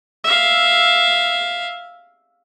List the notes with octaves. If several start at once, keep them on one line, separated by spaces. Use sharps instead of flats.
E5 F5